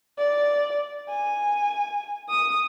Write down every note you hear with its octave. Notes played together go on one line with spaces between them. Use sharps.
D5
G#5
D#6